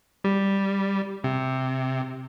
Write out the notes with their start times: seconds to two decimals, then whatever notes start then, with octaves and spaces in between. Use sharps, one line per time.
0.24 G3
1.24 C3